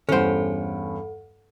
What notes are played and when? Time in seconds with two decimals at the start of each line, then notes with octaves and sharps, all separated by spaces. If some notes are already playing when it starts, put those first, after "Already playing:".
0.09 E2 G2 C#4 A4 C5 F#5